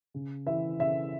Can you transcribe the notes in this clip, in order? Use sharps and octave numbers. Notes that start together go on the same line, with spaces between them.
C#3
E3 E5
C#3 E5